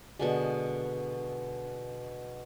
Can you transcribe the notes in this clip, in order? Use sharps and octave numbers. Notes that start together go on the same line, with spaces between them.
B2 D3 G#3